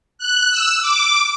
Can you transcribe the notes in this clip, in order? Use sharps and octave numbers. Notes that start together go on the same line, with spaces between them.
F#6
E6
D6